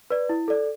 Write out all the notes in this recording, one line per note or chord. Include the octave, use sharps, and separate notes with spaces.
B4 D5
E4
A4 D5